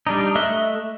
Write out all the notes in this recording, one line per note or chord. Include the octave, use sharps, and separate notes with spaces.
G3 D4 D#4
A3 D#5 E5 F#6